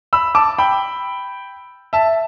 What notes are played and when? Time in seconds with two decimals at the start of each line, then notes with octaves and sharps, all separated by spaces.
0.13 B5 E6
0.35 A5 D6
0.59 G5 B5
1.93 E5 A5